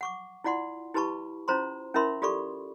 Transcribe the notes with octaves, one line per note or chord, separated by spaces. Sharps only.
F#5 C#6 D6
E4 F4 D5 F#5 C6
E4 G4 B4 A5 B5 C#6
C#4 E4 F4 C5 A#5 C6
C#4 E4 A#4 E5 B5 C6
F4 G4 A4 D5 B5 C#6